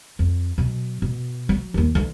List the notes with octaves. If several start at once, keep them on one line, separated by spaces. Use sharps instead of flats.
F2
B2 F#3
B2
F#3
D#2 D#3
D3 E3